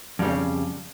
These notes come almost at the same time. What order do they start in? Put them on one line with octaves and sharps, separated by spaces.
F2 G3 C#3